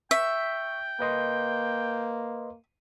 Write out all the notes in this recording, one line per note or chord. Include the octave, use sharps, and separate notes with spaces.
E5 G5 C#6
A#3 B4 D#5 C6